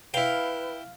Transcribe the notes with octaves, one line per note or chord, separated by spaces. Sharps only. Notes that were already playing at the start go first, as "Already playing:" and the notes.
E4 B4 F5 G5